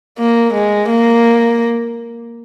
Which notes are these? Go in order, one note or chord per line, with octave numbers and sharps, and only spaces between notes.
A#3
G#3
A#3